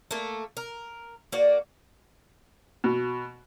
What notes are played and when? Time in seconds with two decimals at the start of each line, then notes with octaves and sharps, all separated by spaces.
0.11 A3 A#3
0.57 A#4
1.32 A#3 F#4 D5
2.84 B2